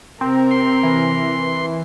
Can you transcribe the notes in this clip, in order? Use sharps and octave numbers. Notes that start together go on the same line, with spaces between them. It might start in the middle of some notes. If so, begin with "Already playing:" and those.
C3 C4 A#4
C6
E3